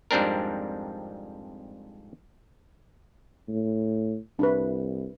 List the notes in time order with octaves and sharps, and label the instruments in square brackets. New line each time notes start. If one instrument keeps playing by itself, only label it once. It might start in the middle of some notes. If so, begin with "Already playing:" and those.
[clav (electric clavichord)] F2 G#2 G3 C4 D4 A#4
[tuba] A2
[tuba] C2 [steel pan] D4 E4 B4